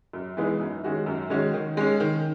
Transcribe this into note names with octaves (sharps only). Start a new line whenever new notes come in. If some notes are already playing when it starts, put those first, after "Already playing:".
F#2
E3 G#3 B3 D#4
F#2
D#3 G#3 C#4 F#4
F#2
D#3 G#3 C#4 F#4
D#3
G#3 C#4
D#3